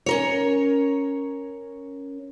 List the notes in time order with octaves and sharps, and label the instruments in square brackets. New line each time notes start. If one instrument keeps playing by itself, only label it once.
[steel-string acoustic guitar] C#4 A#4 C#5